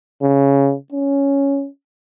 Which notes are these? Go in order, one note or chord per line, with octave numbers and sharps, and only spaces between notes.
C#3
C#4